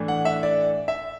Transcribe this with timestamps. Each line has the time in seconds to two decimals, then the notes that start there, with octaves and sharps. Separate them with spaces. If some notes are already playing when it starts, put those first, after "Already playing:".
Already playing: A2 E3 A3 D4
0.08 F#5
0.25 E5
0.43 D5
0.88 E5